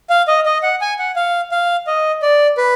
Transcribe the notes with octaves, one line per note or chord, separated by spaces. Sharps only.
F5
D#5
D#5
F#5
G#5
F#5
F5
F5
D#5
D5
B4